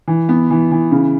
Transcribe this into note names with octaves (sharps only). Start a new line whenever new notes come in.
E3
B3
E3
E3
C#3